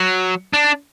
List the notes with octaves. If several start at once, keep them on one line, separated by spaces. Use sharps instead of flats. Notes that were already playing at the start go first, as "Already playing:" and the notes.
Already playing: F#3
D4